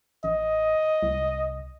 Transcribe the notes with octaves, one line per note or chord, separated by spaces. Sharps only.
A1 D#5
C2